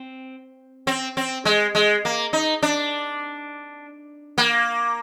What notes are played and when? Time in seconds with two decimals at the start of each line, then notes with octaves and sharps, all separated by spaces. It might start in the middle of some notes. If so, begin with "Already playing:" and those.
Already playing: C4
0.87 C4
1.17 C4
1.45 G#3
1.75 G#3
2.05 A#3
2.33 D#4
2.62 D4
4.38 A#3